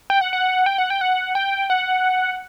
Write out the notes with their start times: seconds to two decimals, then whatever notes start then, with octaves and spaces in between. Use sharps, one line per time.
0.10 G5
0.21 F#5
0.33 F#5
0.66 G5
0.78 F#5
0.90 G5
1.01 F#5
1.35 G5
1.70 F#5